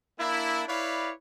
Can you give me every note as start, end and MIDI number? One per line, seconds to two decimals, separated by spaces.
0.19 0.63 58
0.19 0.63 62
0.19 0.63 64
0.68 1.11 64
0.68 1.11 71
0.68 1.11 73
0.68 1.11 74
0.68 1.11 77